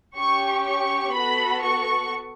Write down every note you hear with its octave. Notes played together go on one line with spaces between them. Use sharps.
C#4 G4 C#6
C#6
B3 F#4 A4 B5
C#6